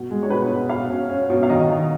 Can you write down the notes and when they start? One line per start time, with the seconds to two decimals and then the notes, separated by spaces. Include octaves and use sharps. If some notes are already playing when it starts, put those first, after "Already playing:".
Already playing: B2
0.11 G#3
0.23 C#5
0.30 B2 B4
0.50 B2
0.69 B2 F5
0.90 C#4
1.10 C#4
1.30 B2
1.43 F5
1.50 D#3 D#5
1.71 D#3